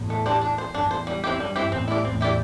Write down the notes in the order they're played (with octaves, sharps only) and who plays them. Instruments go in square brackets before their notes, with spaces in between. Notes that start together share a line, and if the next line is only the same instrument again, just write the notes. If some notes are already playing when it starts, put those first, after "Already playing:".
Already playing: [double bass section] E2 A2
[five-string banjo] A3
D4 G4 C5
D4
C5
[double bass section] E2 [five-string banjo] D4
[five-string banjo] C5
G3
C4 E4 G4
[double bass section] G2 [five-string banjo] G3
[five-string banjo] C4 E4 G4
[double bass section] E2 A2 [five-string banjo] C4
[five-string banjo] E4 G4 D5
[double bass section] E2 A2 [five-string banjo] C4
[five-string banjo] E4 G4 D5